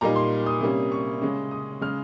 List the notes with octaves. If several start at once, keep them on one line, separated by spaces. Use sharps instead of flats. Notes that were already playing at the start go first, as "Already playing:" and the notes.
A#2 G3 A#3 D#4 A#5
C6
D#6
C3 G3 A#3 C#4
C#6
C#3 G#3 C#4
D#6
C#3 G#3 F6